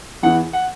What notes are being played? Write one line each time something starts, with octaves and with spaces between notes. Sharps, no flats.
E2 E3 F#5
F#5